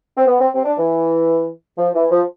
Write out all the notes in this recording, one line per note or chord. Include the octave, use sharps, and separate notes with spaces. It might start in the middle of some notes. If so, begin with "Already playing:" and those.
C4
B3
C4
C4
D4
E3
F3
E3
F3